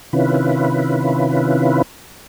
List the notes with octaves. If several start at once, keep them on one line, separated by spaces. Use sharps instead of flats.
C3 D#3 C#4 E4 F4 B4